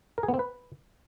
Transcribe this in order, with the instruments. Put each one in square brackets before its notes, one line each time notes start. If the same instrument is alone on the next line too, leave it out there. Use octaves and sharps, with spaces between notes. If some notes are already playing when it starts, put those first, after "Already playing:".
[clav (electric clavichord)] A#4
G#4
B3
C4
B4